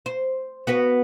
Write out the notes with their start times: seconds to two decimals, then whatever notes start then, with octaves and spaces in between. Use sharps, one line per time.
0.06 C5
0.67 B3 F#4 B4